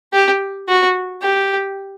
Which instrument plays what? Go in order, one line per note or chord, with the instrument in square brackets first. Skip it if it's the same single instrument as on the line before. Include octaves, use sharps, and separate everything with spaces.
[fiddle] G4
F#4
G4